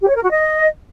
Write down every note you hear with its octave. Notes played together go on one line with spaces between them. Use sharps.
G4
C#5
A#4
F#4
D#5